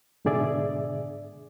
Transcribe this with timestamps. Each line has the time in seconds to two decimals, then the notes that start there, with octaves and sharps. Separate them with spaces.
0.25 G#2 B2 D3 G#4 D5 E5